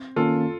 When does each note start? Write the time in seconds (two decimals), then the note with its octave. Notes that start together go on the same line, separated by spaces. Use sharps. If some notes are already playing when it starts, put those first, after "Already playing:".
Already playing: C4
0.16 D#3 A#3 C#4 F4 A4